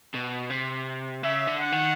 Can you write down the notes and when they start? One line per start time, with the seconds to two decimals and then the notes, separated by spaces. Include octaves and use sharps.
0.15 B2
0.50 C3
1.23 C#3 E5
1.47 D3
1.59 F#5
1.72 D#3